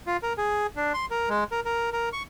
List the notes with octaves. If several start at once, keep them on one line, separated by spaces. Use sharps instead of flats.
F4
A#4
G#4
D4
C6
A#4
G#3
A#4
A#4
A#4
C#6